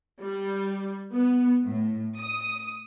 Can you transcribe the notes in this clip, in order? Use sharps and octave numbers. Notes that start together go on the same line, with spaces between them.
G3
B3
A2
D#6